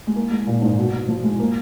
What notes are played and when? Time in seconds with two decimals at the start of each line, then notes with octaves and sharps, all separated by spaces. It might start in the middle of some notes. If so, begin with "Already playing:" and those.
0.07 G#3
0.15 A#3
0.31 G#3
0.47 A#2
0.62 G#2
0.78 B2
0.93 B2
1.08 F3
1.23 G#3
1.39 A#3